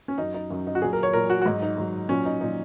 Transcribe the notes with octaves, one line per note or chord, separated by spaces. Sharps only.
C#4
F#2 F#3 D#4
D#4
F#2 F#3
D#4
F#4
A#2 F#3 G#4
A#4
C#5
A#2 F#3 A#4
F#4
F#4
G#2 F#3 D#4
D#4
G#2 F#3
A#2 F#3 C#4
D#4
A#2 F#3 D#4